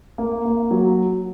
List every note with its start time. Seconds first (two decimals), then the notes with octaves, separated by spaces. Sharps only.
0.18 A#3
0.45 A#3
0.71 F#3